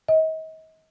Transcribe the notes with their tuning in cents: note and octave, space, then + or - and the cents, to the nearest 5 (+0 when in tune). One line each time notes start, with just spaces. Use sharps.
D#5 +35